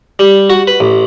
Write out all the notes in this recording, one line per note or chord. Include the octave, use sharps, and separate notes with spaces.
G3
F#4
B4
A1